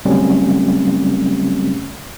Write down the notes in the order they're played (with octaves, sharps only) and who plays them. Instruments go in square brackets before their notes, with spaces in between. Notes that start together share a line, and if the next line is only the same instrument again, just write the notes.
[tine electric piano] C#3 F#3 G3 A3 C4 C#4